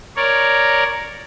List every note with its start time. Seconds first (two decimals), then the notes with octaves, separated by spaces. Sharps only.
0.16 A#4 C#5 D5